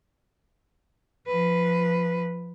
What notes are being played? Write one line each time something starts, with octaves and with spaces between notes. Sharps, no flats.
F3 B4